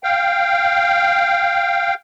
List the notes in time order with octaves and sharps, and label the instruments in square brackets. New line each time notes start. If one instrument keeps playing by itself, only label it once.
[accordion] F5 G5